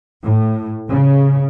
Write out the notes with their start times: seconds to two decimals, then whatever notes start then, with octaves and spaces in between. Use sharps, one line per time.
0.24 A2
0.89 C#3